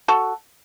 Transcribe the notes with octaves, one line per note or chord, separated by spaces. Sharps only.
F#4 A4